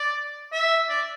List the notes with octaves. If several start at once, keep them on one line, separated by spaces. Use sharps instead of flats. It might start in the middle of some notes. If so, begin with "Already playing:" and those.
Already playing: D5
E5
D5